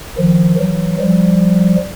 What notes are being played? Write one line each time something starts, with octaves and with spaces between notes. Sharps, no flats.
D#3 F3
E3 F#3
F3 G3